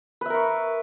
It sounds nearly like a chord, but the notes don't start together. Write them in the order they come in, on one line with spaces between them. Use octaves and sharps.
B4 E5 A#4 C#6